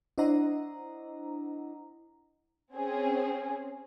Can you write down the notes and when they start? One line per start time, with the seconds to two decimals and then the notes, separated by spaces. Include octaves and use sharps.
0.18 D4 E4 C5 D#5 F#5 A#5
2.75 C4 C#4 G#4